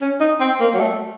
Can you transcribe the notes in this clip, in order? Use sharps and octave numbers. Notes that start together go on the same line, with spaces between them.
C#4
D#4
C4
A#3
F#3
A3